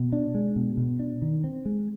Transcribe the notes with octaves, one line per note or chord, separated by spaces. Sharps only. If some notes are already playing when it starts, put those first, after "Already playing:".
Already playing: B2
D4
G#3
B2
B2
D4
D#3
C4
G#3